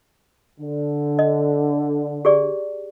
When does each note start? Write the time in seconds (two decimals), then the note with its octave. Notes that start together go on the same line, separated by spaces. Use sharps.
0.60 D3
1.19 D#5
2.25 G4 G#4 D5